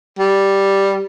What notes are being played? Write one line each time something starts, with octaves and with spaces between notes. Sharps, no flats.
G3